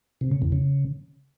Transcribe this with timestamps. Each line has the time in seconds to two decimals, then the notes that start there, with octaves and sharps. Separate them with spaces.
0.21 C3
0.32 C#3
0.42 E2
0.52 C#3